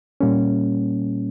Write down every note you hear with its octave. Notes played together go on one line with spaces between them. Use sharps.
A#2 G3 A#3 C#4